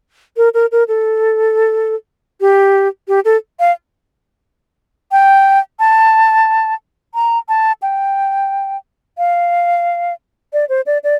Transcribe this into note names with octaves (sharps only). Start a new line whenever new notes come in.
A#4
A#4
A#4
A4
G4
G4
A4
F5
G5
A5
A#5
A5
G5
F5
D5
C5
D5
D5